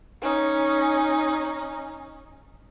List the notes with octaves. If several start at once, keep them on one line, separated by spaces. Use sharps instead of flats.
C#4 D#4